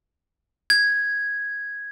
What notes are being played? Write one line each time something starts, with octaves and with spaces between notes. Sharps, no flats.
G#6